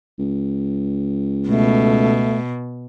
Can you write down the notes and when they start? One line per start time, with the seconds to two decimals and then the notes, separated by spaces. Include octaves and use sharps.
0.19 C#2
1.49 B2 A3